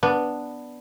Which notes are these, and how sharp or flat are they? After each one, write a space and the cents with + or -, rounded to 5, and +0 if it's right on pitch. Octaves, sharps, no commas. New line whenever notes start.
B3 +0 D4 +0